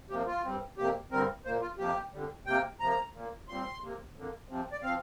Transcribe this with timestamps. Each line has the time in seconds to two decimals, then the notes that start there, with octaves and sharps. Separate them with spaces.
0.10 C3 F3 A#3 G4
0.27 F4
0.44 G2 G3 C4
0.78 F2 C3 A#3 G4
1.11 G2 D3 G3 C4 A#4
1.45 A#2 A#3 C5
1.62 F4
1.78 F2 C3 F3 A#3 G4
2.13 F2 D3 G3
2.46 C3 A#3 G5
2.80 C3 F3 A#3 A#5
3.13 A#2 A#3
3.48 A#2 G3 C4 C6
3.82 C3 A#3
4.16 F2 D3 A#3
4.49 C3 F3 C4
4.72 D5
4.83 F3 C4 F5